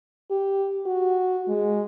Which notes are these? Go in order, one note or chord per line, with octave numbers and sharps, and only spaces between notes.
G4
F#4
G#3